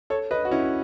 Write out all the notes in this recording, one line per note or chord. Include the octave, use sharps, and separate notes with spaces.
A4 C#5
B4 D#5
F#4
C#4 E4